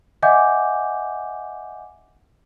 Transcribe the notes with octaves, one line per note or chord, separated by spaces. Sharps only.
D#5 E5 F#5 G#5 D6 G6